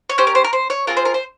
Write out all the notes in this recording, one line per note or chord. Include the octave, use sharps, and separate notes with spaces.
C#5
C#4 G4 C5
A#4
C5
A#4
C5
C#5
C4 F4 G#4 A#4
C5
A#4
C5